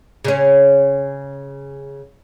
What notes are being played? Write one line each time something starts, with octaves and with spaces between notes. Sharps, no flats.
C#3 C#4